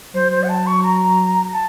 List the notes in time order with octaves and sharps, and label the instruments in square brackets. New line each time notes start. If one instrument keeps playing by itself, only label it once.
[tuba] F#3 [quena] C5
[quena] C5
F#5
A5
C#6
A#5
A5